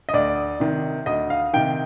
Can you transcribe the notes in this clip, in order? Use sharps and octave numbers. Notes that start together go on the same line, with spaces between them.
D#5
D2 D5
C3 D#3
D2 D#5
F5
C3 D#3 G5